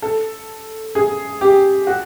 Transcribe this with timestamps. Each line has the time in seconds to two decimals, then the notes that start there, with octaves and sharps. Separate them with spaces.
0.02 A4
0.95 G#4
1.41 G4
1.87 F#4